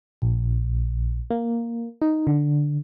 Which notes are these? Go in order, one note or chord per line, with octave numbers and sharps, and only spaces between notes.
A#1
A#3
D#4
D3